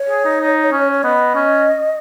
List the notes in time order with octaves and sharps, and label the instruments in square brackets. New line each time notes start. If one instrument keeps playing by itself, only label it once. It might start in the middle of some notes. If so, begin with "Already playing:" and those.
Already playing: [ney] C#5
[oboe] G#4
D#4
D#4
C#4
[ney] C#5
[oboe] B3 [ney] D#5
[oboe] C#4